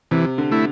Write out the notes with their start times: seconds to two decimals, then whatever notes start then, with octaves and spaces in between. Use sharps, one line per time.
0.11 C3 E3
0.38 D3
0.51 A3 E4